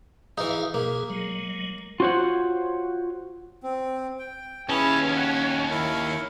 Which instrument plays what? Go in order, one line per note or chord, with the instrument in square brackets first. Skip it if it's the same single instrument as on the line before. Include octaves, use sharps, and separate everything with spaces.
[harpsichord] E3 D#4 [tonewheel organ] G#4 E5 F5
[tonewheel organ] B2 G#4 [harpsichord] A#3
[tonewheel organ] F#3 G#3
[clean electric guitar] F4 F#4 C5 C#5 F#5
[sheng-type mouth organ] C4
G5
[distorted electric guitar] D#2 A5 [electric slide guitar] C#4 [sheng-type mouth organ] E4 G#4 B4
[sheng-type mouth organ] F#5
E4 A#4 C#5